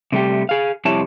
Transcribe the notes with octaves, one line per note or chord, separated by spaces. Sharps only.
C3 G3 A3 G4
G#4 F5
F2 C3 G3 E4 C#5 A5